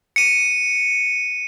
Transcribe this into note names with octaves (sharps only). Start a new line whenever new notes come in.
C#7 D#7